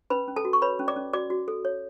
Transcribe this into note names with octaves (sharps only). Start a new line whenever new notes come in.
C#4 B4 B5
C#4
A4 A5
F#4
C#6
B4 C#5 B5
C#4
D5 D6
C#4
F#4 D5 D6
F#4
A4
C#5